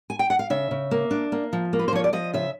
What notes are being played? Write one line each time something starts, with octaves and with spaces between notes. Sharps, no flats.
G#5
G5
F#5
F5
C#3 E5
C#3
A#3
D4
A#3
F3
A#3
B4
C5
F3 C#5
D5
F3 D#5
C#3 E5